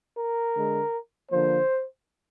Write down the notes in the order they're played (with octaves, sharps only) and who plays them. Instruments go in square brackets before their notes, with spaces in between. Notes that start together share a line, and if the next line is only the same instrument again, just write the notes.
[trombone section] A#4
D3 G#3
D3 F3 A#3 C5